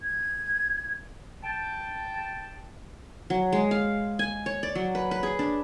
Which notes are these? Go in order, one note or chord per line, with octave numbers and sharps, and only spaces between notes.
G#6
G5 A5
F#3
G#3
F5
G#5
C#5
D5
F#3
B4
B4
G#4
D4